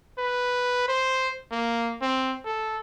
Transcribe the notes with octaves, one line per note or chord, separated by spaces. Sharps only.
B4
C5
A#3
C4
A4